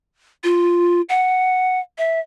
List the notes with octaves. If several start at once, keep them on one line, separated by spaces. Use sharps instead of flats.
F4
F#5
E5